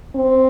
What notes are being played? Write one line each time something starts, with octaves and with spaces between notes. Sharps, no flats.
C4